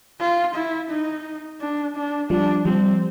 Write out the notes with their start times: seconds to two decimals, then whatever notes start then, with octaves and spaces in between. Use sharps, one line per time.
0.20 F4
0.55 E4
0.90 D#4
1.61 D4
1.96 D4
2.30 F3 G3 D4
2.65 F3 G3 C4